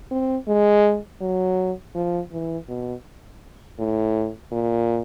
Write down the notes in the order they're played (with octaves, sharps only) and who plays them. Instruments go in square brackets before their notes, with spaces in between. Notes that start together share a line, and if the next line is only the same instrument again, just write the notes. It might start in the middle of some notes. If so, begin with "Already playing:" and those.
[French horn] C4
G#3
F#3
F3
E3
B2
A2
A#2